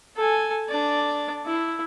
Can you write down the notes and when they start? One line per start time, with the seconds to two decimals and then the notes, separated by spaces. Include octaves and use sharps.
0.16 A4 G#5
0.69 D4 D5
1.46 E4